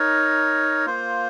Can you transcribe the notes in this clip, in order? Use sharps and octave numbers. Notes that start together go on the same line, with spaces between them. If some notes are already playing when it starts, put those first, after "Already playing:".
Already playing: D#4 A#4 C#5
A#3 F4 C5